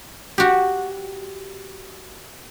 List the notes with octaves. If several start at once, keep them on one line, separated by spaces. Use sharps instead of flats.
F#4 G4